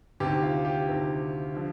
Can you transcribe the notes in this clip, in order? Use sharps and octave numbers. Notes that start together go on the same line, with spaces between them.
D2 C3 D#3 G4
F4
G4
D2 C3 D#3
D3 F3